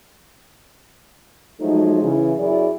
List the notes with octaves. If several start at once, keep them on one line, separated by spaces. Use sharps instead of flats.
F3 F#3 G#3 A3 D#4
C#3 E3
F#2 F#3 E4 G#4 D5